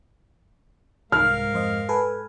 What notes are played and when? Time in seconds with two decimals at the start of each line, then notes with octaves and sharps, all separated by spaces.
1.12 C2 G#2 A#4 F5 F6
1.54 F2 C5 D#5
1.89 A4 B4 G#5